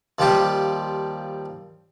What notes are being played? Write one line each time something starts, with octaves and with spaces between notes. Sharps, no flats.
D#2 F3 G3 F4 G4